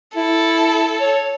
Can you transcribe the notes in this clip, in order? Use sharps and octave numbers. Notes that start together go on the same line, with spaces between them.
E4 A4
C#5